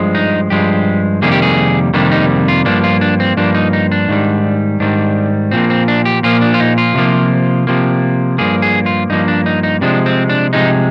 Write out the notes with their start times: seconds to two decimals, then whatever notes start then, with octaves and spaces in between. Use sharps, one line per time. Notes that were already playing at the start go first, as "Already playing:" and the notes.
Already playing: G2 F3 G#3
0.15 D#4
0.50 G2 F3 G#3 G4
1.22 F2 C3 D#3 G3 A#3 G#4
1.32 G4
1.42 G#4
1.94 F2 C3 D#3 G3 A#3 D4
2.12 D#4
2.48 F4
2.65 G2 F3 A#3 D4
2.84 F4
3.01 D4
3.20 C4
3.37 G2 F3 A#3 D4
3.55 D#4
3.73 D#4
3.92 D4
4.09 G#2 D#3 G3
4.80 G#2 D#3 G3 D4
5.51 A#2 F3 A#3 C4
5.70 C4
5.88 D4
6.05 G4
6.23 A#2 F3 A#3 F4
6.41 D4
6.54 F4
6.60 D#4
6.78 F4
6.95 C3 F3 A#3
7.67 C3 F3 A#3
8.38 G2 F3 A#3 G#4
8.62 G#4
8.86 F4
9.10 G2 F3 A#3 D#4
9.28 D4
9.46 D#4
9.63 D#4
9.81 C3 F3 G#3 D4
10.06 C4
10.29 D4
10.53 C3 F3 G#3 D#4